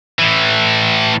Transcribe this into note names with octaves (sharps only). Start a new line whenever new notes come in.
A2 E3